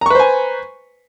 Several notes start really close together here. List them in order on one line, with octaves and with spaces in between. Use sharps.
A#5 C#6 B4 C5 G#5